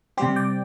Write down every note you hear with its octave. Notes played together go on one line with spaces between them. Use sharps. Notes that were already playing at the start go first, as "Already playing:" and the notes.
C3 G3 C4 G4 C5
D5 G5